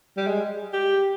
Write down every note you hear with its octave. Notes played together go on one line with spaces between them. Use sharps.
G3
G#3
G4